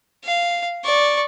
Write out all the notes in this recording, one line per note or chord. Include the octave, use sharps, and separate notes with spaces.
F5
D5 C#6